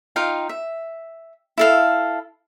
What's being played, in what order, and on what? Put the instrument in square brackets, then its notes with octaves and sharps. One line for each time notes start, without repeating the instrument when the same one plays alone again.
[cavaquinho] D#4 F4 F5 G5
E5
E4 A4 F5